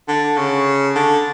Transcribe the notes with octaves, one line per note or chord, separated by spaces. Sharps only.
D3
C#3
D3